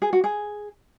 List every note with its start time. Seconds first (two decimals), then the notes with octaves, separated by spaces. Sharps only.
0.02 G#4
0.13 F#4
0.24 G#4